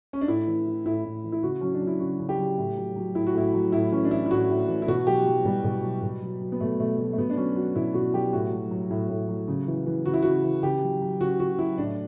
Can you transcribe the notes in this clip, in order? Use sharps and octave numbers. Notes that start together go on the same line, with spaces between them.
C#4
D4
A2 E4
E3
E3
A2 E4
A2
E3
E4
C#3 F#4
F#3 C#4
D4
F#3
E4
C#3 F#4
C#3
G4
F#3
A2
F#3
F#3
A2 E4
F#4
A2 E4
F#3
A2 E4
E3 C#4
D4
E3 E4
E4
A2 F#4
A2
E3
E4
B2 F#4
F#3 G4
F#3
B2 G3
B2
F#3
B2
F#3
F#3
B3
B2 A3
B2 A3
F#3 A3
A3
B2 B3
D4
F#3 C#4
F#3 F#4
B2 E4
B2 F#4
F#3 G4
A2 F#4
F#3
F#3
A2
A2
F#3
C#3
E3
E3
C#3 F#4
E4
C#3 F#4
E3
C#3 G4
F#3
F#3
C#3 F#4
C#3 F#4
F#3 E4
A2 D4